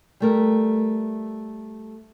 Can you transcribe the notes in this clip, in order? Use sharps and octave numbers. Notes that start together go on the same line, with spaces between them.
G3 A3 A#4